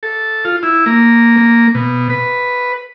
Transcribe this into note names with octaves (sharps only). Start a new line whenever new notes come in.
A4
F4
E4
A#3
A#3
B2
B4